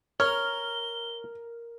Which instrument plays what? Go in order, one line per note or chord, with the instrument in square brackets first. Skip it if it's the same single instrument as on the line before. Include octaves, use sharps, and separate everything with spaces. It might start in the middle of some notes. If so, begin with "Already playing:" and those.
[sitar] A#4 [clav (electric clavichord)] C#5 [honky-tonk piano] F6 [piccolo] G7